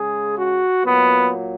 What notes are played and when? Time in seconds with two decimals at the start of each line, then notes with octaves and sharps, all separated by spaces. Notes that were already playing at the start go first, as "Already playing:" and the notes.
Already playing: C#3 G#3 G#4
0.36 F#4
0.83 A#2 F#3 B3